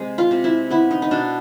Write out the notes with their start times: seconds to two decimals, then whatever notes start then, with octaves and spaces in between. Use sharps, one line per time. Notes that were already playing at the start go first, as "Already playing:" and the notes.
Already playing: C3 G#3
0.18 F4
0.31 C3
0.44 E4
0.70 B3 E4
0.91 D#4
1.02 D#4
1.11 B2 D4